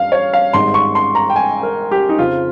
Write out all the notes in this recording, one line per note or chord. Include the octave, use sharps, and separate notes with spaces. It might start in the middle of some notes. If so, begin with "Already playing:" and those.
Already playing: G2 F5
C#5
F5
G#1 G#2 G3 C6
C#6
C6
A#5
G5
G#5
A#4
G4
D#4
F2 C#3 F3 C4 F4